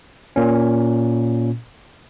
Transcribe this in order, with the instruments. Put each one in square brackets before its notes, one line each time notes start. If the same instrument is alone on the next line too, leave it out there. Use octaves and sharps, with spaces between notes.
[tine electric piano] A#2 C#4